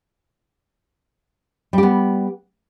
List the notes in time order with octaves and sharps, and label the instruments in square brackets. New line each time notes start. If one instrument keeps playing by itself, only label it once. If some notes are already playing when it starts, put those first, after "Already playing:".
[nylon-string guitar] G3
G4
B3